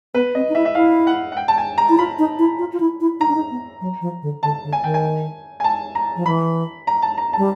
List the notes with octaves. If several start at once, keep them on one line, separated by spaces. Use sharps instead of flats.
B3 B4
C4 D#5
D#4
E4 E5
E5
E4 F5
F#5
F#5
G5
A5
G#5
A#5
E4
F4 B5
D#4
E4
F4
F4
E4
E4
D#4 A#5
D4
D#4
B3
F#3
F3
D3
D3 A5
D3
G#5
D#3 G5
G#5
G#5
A5
A#5
F3
E3 B5
A#5
A5
A#5
G3 A5